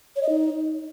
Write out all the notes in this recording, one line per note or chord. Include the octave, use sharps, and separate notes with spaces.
C#5
D#5
D#4